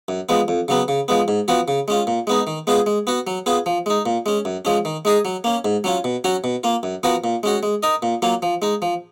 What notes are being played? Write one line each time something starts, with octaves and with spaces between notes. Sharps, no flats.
F#2
F3 G#3 B3
F2
C#3 F#3 B3
C#3
F3 G#3 B3
G#2
F3 B3 F#4
C#3
G#3 C#4 F4
A#2
G#3 B3 D#4
D#3
G#3 B3 F4 G#4
G#3
B3 F#4
F#3
B3 F4 G#4
F3
G#3 D#4
A#2
G#3 C#4
F#2
F3 G#3 C#4
D#3
G#3 D#4 G#4 D#5
F#3
A#3 C#4
G#2
F#3 C#4 F4
B2
F#3 C#4 F#4
B2
A#3 F4
F#2
F3 B3 F#4 A#4
A#2
G#3 C#4 F#4
G#3
D#4 A#4 D#5
A#2
F#3 A#3 F4
F3
G#3 D#4
F3